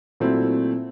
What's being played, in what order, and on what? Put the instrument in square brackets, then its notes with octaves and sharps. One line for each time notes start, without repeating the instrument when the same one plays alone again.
[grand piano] A#2 F#3 A3 C4 E4